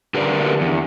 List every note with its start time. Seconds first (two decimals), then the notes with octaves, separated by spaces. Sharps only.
0.14 D3 G4 A#4 B4 D5
0.61 E2